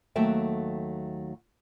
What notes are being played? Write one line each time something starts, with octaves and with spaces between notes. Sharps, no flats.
D#2 F#3 A3 A4 E5 G5